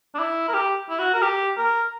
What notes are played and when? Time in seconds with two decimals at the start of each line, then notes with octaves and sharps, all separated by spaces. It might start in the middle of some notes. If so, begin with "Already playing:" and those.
0.15 D4
0.19 E4
0.48 A#4
0.54 G4
0.89 E4
0.99 F#4
1.14 A#4
1.22 G4
1.57 A#4